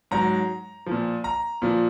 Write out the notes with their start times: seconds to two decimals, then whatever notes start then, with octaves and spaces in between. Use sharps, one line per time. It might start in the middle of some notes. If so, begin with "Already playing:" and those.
0.11 G#2 F#3 A#5
0.86 A#2 F3
1.24 A#5
1.62 A#2 F3